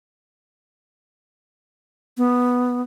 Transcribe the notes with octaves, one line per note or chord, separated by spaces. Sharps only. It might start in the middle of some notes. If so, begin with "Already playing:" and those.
B3